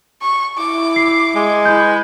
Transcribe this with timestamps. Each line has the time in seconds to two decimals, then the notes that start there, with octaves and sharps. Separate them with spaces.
0.22 C#6
0.58 E4 D6
0.96 C7
1.36 G#3
1.65 E4 B4 G6